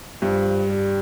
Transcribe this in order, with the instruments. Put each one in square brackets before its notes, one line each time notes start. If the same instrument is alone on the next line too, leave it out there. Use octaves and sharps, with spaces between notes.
[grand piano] G2 [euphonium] F3
[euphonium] G3